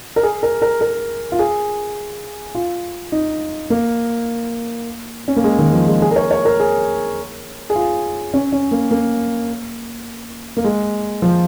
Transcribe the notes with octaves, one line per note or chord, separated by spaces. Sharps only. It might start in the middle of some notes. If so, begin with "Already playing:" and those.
A#4
G#4
A#4
A#4
A#4
F4
G#4
F4
D#4
A#3
C#4
A#3
G#3
D#3
F3
G#3
G#4
A#4
C#5
C#5
A#4
G#4
G#4
F4
C#4
C#4
A#3
A#3
A#3
G#3
F3